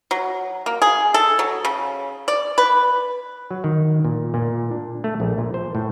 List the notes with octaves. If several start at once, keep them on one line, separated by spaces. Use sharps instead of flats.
F#3
A#3
G#4
A4
F#3
C#3
D5
B4
F#3
D#3
A#2
A#2
D4
A3
A#1
A#2
C5
A2